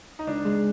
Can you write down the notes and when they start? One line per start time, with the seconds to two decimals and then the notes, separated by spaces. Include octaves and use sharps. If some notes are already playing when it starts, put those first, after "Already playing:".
0.19 D#4
0.27 C#2 D4
0.45 G#3